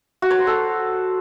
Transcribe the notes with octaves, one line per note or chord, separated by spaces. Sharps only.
F#4
C#5
C5
A4